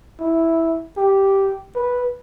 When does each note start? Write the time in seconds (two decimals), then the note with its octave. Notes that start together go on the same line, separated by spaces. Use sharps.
0.20 E4
0.97 G4
1.75 B4